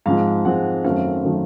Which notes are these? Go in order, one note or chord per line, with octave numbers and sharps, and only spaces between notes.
G#2 F3 G#3 C4 F5
G#2 F3 G#3 C4 F#5
F#2 D#3 F#3 A3 C4 F5
D#3 F#3 A3 C4